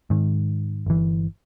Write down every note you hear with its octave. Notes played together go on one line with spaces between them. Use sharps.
G#2 D#3
G1 E3